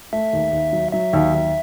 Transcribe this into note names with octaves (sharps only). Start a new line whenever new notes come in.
A3 E5
D#2
D#2
F#3
F#3 E5
D#2
D#2